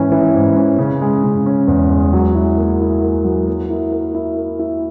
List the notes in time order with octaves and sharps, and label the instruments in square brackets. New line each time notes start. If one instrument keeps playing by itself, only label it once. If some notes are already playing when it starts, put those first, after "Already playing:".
Already playing: [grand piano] G#2 E3 C#4
E3
G#2
C#4
C#3
G#3
C#3
C#4
E2
G#3
F#3
E4
A#3
E4
A#3
F#3
A#3
E4
A#4
E4
A#3
E4